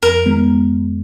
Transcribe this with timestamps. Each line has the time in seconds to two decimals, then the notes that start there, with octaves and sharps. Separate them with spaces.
0.03 F2 A#4
0.26 D#3 G#3 B3